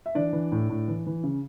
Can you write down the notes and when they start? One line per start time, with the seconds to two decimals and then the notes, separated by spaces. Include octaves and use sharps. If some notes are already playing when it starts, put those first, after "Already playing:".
0.06 E5
0.15 E3 D4 D5
0.33 E3
0.52 A2
0.69 A2
0.88 E3
1.07 E3
1.24 C#3